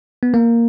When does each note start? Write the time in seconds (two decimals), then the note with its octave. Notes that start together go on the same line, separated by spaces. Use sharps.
0.23 B3
0.34 A#3